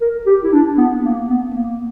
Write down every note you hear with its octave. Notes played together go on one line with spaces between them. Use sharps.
A#4
G4
E4
D4
B3
A#3
B3
A#3